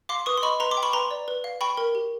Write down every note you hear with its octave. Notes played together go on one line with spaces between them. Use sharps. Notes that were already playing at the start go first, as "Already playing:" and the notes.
F5 C6 D6
B4 C#6 D#6
C6
D#5 B5 C#6
B4 A#5 C6
C6 D6
G5
B5 C#6
B4 A#5 C6
D5
B4
F5
G5 B5 C#6
A#4
G4